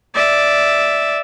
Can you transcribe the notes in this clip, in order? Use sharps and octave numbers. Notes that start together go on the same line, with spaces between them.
D5 E5